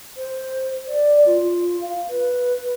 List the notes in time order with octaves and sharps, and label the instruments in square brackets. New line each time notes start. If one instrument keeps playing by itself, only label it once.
[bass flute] C5
D5
F4
F5
B4